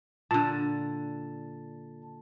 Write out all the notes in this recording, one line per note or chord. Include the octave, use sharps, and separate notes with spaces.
A#2 D3 A5